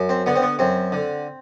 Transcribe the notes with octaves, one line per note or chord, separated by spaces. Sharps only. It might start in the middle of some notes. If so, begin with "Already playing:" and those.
Already playing: F#2
C4
D3 B3
C4
B3
F#2 C4
D3